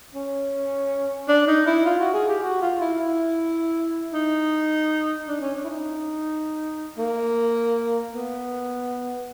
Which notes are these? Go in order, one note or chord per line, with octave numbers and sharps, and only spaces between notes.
C#4
D4
D#4
E4
F4
F#4
G#4
G4
F#4
F4
E4
E4
D#4
D4
C#4
D4
E4
D#4
A#3
B3